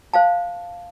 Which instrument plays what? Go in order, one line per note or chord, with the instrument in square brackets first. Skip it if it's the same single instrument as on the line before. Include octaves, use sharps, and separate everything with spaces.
[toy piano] C5 F5 A5